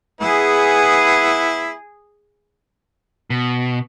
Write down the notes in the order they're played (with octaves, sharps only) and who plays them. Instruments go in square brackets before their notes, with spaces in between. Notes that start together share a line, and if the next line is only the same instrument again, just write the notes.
[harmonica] B3 E4 [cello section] G#4
[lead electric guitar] B2